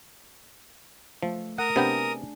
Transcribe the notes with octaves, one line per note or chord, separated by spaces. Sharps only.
F3 A3
A#4 F#5 D#6
C3 B3 D4 G#4 G5